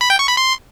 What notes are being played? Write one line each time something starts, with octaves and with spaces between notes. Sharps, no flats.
B5
G5
C#6
B5
C6